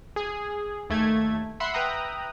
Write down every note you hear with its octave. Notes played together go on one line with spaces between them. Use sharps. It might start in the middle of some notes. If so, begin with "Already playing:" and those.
G#4
D#2 A3 G#6
E5 F#5 B5 C6 C7 C#7
B4 E5 G5 A#5 D#6 F#6